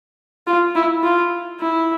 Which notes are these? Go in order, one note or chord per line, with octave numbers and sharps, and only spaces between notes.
F4
E4
F4
E4